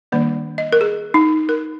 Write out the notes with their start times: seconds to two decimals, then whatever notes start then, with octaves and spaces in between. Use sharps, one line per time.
0.12 D#3 G3 A#3 D4 D5
0.58 D#5
0.73 A#4
0.81 G#4
1.14 D#4
1.49 A#4